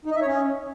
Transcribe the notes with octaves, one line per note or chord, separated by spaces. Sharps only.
D#4
D#5
E5
C#5
C#4